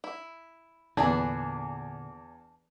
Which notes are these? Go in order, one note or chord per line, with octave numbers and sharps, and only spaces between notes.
E4
E2 A#2 D3 D4 G#4 B4